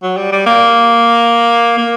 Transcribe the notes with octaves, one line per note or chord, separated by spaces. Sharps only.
F#3
G3
G3
A#3
A#3